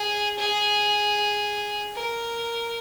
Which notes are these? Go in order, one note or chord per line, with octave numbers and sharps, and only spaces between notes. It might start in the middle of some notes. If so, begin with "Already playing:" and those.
Already playing: G#4
G#4
A#4